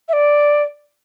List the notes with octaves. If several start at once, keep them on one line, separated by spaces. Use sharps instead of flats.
E5
D5